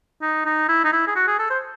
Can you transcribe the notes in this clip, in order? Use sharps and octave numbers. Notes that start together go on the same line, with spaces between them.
D#4
D#4
E4
D#4
E4
G#4
F#4
G#4
A4
C5